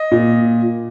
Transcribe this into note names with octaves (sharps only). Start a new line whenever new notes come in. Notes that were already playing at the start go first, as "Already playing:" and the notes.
Already playing: D#5
A#2